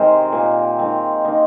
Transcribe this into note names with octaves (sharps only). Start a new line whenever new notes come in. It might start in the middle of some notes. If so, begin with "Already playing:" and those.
Already playing: C3 D#3 G#3 C4 G#4 A#4 C5
A#2 A#3
D#3 G#3 C4
D#3 A#3 D#5